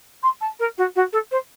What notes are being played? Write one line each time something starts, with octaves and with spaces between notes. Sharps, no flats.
C6
A5
A#4
F#4
F#4
A4
C5